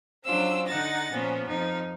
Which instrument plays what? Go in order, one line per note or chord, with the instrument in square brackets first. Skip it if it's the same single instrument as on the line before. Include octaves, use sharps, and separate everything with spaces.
[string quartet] F#3 C#4 D4 F4 C5 E6
D3 D#4 F#5 A6 A#6
A#2 F3 B3 C#4
F2 F3 D#4